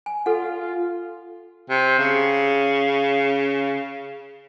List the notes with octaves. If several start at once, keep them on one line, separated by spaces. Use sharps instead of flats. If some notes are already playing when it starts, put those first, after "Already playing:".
G#5
F4 A4 F#5
C3
C#3